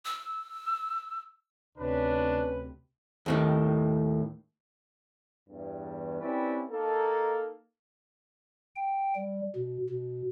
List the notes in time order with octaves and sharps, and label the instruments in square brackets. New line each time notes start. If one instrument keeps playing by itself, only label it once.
[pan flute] E6
[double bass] D2 C3 [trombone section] C#4 [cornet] D4 [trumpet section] B4
[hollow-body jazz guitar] D#2 A2 D#3
[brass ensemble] E2 G2
C4 C#4 E4 G4 B4 D5
A#3 D#4 A4
[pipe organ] G5
G3
B2
B2